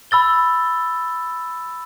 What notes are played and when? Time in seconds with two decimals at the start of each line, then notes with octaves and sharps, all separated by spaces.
0.11 B5 E6 A6 G7